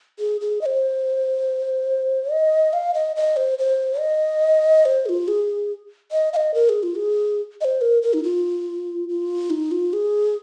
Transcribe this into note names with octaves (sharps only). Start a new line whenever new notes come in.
G#4
G#4
D#5
C5
D#5
F5
D#5
D#5
C5
C5
D#5
C5
G#4
F4
G#4
D#5
F5
D#5
A#4
G#4
F4
G#4
D#5
C5
A#4
A#4
D#4
F4
F4
D#4
F4
G#4